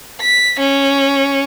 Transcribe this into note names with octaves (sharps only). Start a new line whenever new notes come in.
B6
C#4